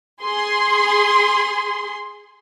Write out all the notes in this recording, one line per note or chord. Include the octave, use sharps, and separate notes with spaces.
G#4 C6